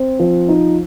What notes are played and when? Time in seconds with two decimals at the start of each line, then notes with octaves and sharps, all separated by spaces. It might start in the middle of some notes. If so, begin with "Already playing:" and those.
Already playing: C4
0.19 F3
0.49 D#4